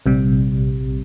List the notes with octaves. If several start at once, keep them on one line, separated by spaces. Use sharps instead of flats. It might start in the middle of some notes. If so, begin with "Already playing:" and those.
A#1 C3 G3